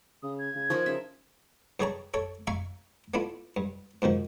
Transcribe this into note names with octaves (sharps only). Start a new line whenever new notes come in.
C#3 D#6
G#6
C#3
F3 D#4 A#4
C#3 E5
G2 G3 G#4 C#5 A5 A#5
A4 C#5 A5
E5 F5 G#5 A#5 C#6
A3 B3 D4 E4 F4
G2
G#2 B2 D#3 F3